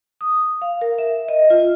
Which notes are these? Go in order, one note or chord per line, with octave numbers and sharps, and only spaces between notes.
D#6
F5
A#4
E5
D#5
F4